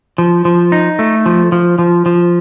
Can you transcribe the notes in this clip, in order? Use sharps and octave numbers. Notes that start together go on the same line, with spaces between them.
F3
F3
D#4
A3
F3
F3
F3
F3